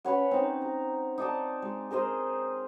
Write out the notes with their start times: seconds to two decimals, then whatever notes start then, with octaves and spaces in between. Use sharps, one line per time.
0.05 C#4 B4 C#5 F#5
0.31 C4 D#4
0.62 A#5
1.18 D#4 D5 A5
1.62 G#3
1.91 G#4 A#4 C5 D#5